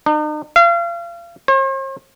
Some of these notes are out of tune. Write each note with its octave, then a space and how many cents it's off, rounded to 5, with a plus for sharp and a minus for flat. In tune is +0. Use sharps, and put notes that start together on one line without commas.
D#4 -45
F5 -35
C5 +45